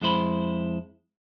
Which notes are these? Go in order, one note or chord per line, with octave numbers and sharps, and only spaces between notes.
F2 G#3 E4 C5 B5